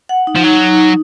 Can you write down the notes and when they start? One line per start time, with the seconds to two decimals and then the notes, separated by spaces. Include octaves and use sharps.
0.09 F#5
0.27 D#4
0.36 F3
0.44 F#3 D#4
0.62 D#4
0.78 D#4